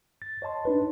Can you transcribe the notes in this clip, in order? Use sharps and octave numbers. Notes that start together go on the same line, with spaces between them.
A6
C#5 D#5 A5 C6
D4 D#4 B4